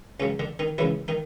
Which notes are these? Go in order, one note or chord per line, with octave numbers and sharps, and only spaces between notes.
C#2 C#3 F#3 C#4
D3 D4
D#3 D#4
C#2 C#3 E3 F#3 E4
D#3 D#4